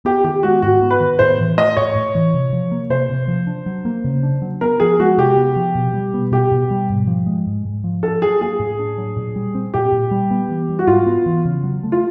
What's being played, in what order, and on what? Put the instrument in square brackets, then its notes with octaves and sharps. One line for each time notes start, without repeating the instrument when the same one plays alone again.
[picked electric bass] B3 [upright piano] G4
[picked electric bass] D#3 [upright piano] G4
[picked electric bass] G#3 [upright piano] F#4
[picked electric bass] G#2 [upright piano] F#4
[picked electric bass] B3
[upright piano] B4
[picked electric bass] D#3
[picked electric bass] A2 [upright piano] C5
[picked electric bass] E3
[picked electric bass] A3 [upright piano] D#5
[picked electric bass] A2 [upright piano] C#5
[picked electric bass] A2
E3
C3
F3
A#3
[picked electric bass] C3 [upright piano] C5
[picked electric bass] C3
F3
D4
F#3
A#3
C#3
D4
F#3
[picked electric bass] B3 [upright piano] A#4
[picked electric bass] F3 [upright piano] G#4
[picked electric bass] G#3 [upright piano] F#4
[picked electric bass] C3 [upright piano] G4
[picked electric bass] B3
F3
B2
G3
B3
[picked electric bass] B2 [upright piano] G4
[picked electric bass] B2
G3
G#2
F3
G#3
G#2
G#2
F3
[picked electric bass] D4 [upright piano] A4
[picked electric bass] F#3 [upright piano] G#4
[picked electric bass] A#3 [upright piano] G#4
[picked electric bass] A2
D4
F#3
A#2
G3
C4
[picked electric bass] A#2 [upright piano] G4
[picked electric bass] A#2
G3
B3
E3
G3
[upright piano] F#4
[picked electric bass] G#2 [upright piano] F4
[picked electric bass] B3
E3
C#3
F#3
A3
[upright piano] F4